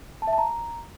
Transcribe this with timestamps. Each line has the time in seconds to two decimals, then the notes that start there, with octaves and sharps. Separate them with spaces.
0.22 A5
0.27 E5
0.33 A5
0.38 A#5